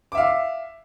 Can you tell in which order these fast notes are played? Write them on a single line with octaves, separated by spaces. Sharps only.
D6 E5 F5